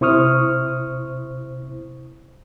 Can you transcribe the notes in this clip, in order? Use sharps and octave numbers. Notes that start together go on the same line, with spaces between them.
C3 E4 C5 C#6 D#6 F6